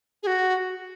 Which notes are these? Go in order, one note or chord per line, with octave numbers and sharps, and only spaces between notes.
G#4
F#4